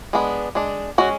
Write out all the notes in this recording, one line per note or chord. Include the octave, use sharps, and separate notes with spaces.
G#3 B3 D4
G#3 D4
G#3 C#4 F#4